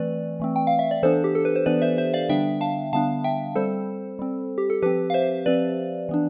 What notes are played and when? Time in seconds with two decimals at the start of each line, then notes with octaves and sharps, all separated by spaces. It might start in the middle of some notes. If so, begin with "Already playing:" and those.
Already playing: E3 A3 C4 B4 D5
0.40 E3 A3 C4
0.56 G5
0.67 F5
0.79 E5
0.91 D5
1.03 E3 B3 D4 A4 C5
1.24 G4
1.35 A4
1.45 B4
1.56 C5
1.66 E3 B3 D4 B4 D5
1.82 C5 E5
1.98 C5 E5
2.14 D5 F5
2.29 D3 G3 B3 D4 E5 G5
2.61 F5 A5
2.93 D3 G3 B3 D4 F5 A5
3.24 E5 G5
3.56 G3 C4 A4 C5
4.19 G3 C4
4.58 G4
4.70 A4
4.82 F3 C4 G4 B4
5.10 F5
5.14 C5 E5
5.46 F3 C4 B4 D5
6.09 E3 B3 D4